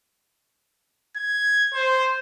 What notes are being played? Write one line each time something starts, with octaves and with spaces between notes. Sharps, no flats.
G#6
C5